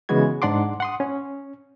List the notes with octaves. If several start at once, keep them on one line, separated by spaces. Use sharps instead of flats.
C#3 E3 G#3 B3 F#4 G#6
G#2 D4 D5 F#5 C6 D6
F#5 C6 D#6
C#4